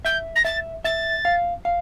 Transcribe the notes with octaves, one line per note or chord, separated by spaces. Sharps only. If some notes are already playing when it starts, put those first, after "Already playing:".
E5 G6
A#6
E5 A6
E5 A6
F5
F5